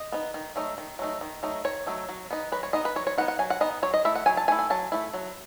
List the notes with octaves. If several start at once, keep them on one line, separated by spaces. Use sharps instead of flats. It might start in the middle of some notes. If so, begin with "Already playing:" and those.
Already playing: D#5
B3 D#4
D#3
F#3 A3 D#4
D#3
F#3 A3 D#4
D#3
F#3 A3 D#4
D#3 C#5
F#3 A3 D#4
F#3
B3 D#4
F#3 B4
C#5
B3 D#4 D#5
B4
F#3 C#5
C#5
B3 D#4 F#5
F#5
F#3 G#5
F#5
B3 D#4 D#5
F#3 C#5
D#5
A3 E4 E5
F#5
F#3 G#5
A5
A3 E4 G#5
G#5
F#3 A5
A3 E4
F#3